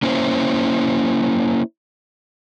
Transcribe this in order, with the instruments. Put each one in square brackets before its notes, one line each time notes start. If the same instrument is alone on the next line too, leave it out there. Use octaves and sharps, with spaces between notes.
[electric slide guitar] A#3 C#4 E4 C5